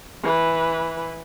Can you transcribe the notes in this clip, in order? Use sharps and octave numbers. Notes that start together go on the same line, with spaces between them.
E3 B4